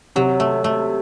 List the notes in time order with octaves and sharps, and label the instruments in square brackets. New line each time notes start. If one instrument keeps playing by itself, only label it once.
[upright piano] C3 [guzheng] F#3
[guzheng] A3
A3